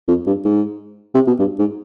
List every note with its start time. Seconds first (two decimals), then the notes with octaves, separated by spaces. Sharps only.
0.08 F2
0.27 G2
0.45 G#2
1.15 C3
1.27 B2
1.39 G2
1.59 G#2